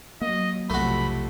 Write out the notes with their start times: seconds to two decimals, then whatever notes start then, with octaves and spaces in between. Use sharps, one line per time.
0.21 F#3 A#3 D#5
0.70 B1 F2 C3 A3 F#4 B5